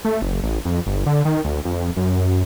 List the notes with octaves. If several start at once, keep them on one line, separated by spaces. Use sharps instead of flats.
A3
F#1
A1
F2
G1
D3
D#3
D2
F2
F#2